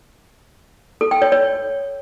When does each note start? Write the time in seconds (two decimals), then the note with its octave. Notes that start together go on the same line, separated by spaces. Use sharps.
1.01 A4
1.11 G5
1.22 C#5
1.32 C#5